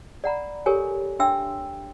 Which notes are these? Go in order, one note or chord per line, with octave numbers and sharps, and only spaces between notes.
D5 F#5 A#5 B5
G4 A4 A#4 C#5 G#5
D4 C#5 E5 G5 C6 E6